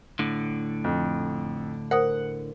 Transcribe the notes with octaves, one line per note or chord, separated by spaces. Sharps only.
A2 D3
F2
A#4 C5 F#5 D#6